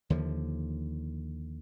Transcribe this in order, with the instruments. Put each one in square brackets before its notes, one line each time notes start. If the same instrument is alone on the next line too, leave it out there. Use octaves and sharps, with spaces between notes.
[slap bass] D#2 D3 F3